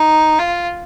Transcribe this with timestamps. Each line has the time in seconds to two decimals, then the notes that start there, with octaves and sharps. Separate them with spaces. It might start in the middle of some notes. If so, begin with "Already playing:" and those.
Already playing: D#4
0.39 F4